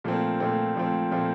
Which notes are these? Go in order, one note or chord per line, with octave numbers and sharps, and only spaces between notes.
A#2 F3 A3 C4
A#2 F3 A3 C4
A#2 F3 A3 C4
A#2 F3 A3 C4